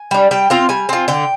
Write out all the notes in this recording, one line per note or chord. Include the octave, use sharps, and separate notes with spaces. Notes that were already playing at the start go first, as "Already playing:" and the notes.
Already playing: G#5
G3 D4
G3 G5
C4 F4 F5
G3 G#5
C4 F4
D3 G5